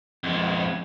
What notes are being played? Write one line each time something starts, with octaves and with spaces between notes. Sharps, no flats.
F2 G#3